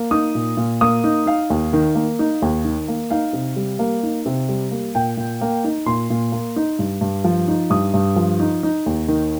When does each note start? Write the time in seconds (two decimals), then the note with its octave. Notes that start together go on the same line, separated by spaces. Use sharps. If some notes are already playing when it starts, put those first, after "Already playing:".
Already playing: A#3
0.11 D#4 D#6
0.35 A#2
0.57 A#2
0.81 A#3 D#6
1.04 D#4
1.26 D#4 F5
1.50 D#2
1.73 D#3
1.95 A#3
2.19 D#4
2.42 D#2
2.64 D#3
2.88 A#3
3.10 D#4 F5
3.33 C3
3.56 G3
3.79 A#3
4.03 D#4
4.26 C3
4.49 G3
4.71 A#3
4.95 A#2 G5
5.17 A#2
5.41 A#3
5.64 D#4
5.86 A#2 C6
6.10 A#2
6.32 A#3
6.56 D#4
6.79 G2
7.01 G2
7.24 F3
7.48 D#4
7.70 G2 D#6
7.94 G2
8.16 F3
8.40 D#4
8.63 D#4
8.86 D#2
9.08 D#3